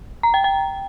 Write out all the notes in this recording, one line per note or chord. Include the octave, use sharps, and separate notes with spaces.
A#5
G5
G5